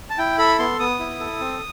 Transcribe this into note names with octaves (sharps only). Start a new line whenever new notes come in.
A5
E4 G5
A4 B5
B3 C6
B3 D#6
E4
A4
C4